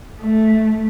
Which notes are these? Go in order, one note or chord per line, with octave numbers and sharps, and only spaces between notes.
A3